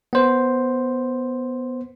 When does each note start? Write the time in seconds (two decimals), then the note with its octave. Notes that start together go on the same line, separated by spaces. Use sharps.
0.13 B3 C5